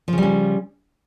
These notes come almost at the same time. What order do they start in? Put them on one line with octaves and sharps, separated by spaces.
F3 C#3 G3 C#4